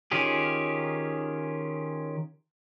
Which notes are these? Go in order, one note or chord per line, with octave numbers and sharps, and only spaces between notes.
D#3 C#4 F4 G4 G#4